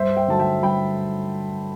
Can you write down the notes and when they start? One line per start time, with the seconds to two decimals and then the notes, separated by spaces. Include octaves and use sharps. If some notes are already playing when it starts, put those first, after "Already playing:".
Already playing: G2 C5 E5
0.16 E5 G5
0.28 D3 F#3 A3 A5
0.39 E5 G5
0.63 G2 G5 B5